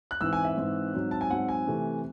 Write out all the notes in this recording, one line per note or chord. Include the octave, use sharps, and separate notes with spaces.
F#6
G#2 E3 C4 E6
G#5
E5
G#2 E3 C4
G#2 F#3 C4
A5
G#5
G#2 F#3 C4 F#5
G#5
C3 E3 A3